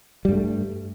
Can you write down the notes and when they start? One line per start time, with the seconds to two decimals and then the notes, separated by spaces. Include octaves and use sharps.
0.25 G3
0.28 G2
0.32 A3